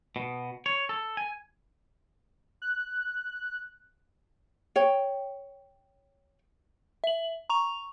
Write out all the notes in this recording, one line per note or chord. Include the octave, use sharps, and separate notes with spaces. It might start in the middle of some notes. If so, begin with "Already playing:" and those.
B2
C#5
A4
G#5
F#6
C#5 G5
E5 F#7
A#5 C#6 F7